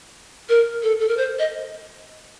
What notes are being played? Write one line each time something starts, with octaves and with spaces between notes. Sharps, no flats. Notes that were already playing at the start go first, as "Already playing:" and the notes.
A#4
A4
A4
A#4
C5
D#5